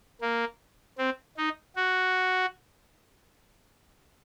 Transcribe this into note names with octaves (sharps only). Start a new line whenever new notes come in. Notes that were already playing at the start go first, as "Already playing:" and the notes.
A#3
C4
D#4
F#4